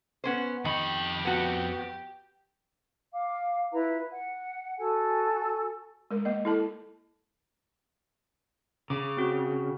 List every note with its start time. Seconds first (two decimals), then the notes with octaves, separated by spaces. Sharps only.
0.24 B3 C#4 C5
0.65 F2 D#3 G4 B5
1.25 B3 F#4
3.14 F5 D6
3.72 E4 F4 B4 A#5
4.11 F#5
4.78 F#4 A4 G#5
6.11 G#3 A#4
6.25 A#3 D#5
6.45 E4 A4 A5
8.90 C#3 D6
9.17 C4 F#4